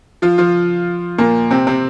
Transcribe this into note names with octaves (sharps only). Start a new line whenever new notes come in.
F3 F4
F3 F4
A#2 A#3
C3 C4
C3 C4